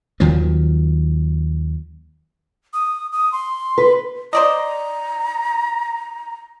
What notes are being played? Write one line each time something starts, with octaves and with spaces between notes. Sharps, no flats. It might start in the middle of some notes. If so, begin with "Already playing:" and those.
D#2 D#3 F3 F#3
D#6
D#6
C6
B4
C5 D5 D#5 A#5